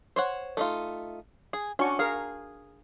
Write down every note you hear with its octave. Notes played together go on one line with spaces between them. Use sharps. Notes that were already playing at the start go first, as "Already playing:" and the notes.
C5 C#5 F#5
A3 D#4 F4
G#4
C#4 D4 F#4 C#6
G#4 A#4 F5